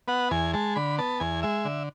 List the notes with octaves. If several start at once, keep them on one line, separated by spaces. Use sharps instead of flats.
B3 F#5
E2 G#5
G#3 A5
D3 B5
B3 A5
E2 G#5
G#3 E5
D3